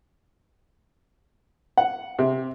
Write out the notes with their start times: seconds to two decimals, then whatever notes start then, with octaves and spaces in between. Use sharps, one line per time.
1.77 F#5
2.19 C3